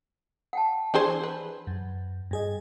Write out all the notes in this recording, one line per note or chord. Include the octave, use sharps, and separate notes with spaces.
F#5 G5 A5
E3 D4 G#4 C5
B4
F#2
G2 G#4 D#5